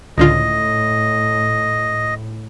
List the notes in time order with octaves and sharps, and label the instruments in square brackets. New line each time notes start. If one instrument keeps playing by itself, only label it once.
[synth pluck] C#2 D3 F4 [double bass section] A2 [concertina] D#5